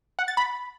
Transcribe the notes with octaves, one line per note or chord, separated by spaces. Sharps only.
F#5
A6
B5